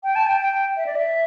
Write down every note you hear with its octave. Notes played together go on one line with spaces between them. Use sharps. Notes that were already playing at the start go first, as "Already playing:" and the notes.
G5
A5
G5
G5
E5
D5
E5